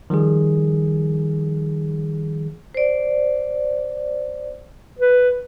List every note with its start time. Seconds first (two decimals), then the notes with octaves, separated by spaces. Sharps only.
0.10 D#3 F3 G3 G#4
2.75 C5 D5
4.99 B4